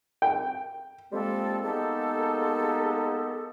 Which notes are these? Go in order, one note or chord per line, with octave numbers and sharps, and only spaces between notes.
G5
F3 G3 G#3 A#3 C4 A4
G#3 A#3 B3 D#4 G4 A4